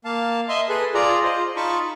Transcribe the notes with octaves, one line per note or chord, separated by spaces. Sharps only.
A#3 F5 A5
D#5 E5 C6
G#4 A4 B4
F4 G#4 D5 A#5
F4 C5 D#5
D#4 F4 A5 B5 C#6